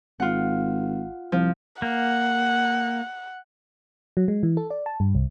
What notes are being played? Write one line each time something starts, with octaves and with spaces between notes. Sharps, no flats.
G#1 F4 F#5
C2 F3
A#3 F#5
F#3
G#3
E3
A4
D5
A5
G2
C2